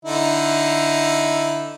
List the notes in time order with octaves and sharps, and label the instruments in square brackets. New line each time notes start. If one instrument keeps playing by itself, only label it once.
[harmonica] D3 D#4 E4